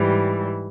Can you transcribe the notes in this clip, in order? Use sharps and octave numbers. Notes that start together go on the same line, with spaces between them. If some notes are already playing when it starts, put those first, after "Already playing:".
Already playing: G#2 E3 G3